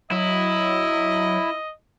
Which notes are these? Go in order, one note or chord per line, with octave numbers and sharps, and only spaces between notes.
F#3 E4 D#5